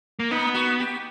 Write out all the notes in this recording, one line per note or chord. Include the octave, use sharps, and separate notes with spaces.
A#3
B3 D#4
F#4
G4